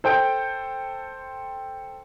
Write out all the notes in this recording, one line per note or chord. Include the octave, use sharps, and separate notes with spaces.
A4 C5 G5 G6 D7